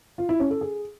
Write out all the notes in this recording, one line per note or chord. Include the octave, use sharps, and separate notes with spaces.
F4
E4
C#4
A4
G#4